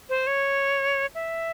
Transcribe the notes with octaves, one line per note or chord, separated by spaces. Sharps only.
C5
C#5
E5